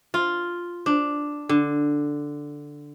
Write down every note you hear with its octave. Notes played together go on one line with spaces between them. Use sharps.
F4
D4
D3